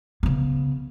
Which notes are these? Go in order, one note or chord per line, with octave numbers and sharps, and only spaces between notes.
C#3 B3